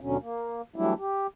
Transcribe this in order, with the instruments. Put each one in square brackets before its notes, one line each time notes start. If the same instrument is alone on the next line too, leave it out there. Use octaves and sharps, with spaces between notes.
[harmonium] D#2 B2 D3 F#3 C#4
A#3
E3 F#3 G3 A3 D4 E4
G4